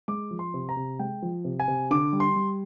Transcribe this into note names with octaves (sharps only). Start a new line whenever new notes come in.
G#3 D6
F3
C6
C3
A#5
C3
G#3 G5
F3
C3
G#5
C3
D3 D6
G3
C6
G3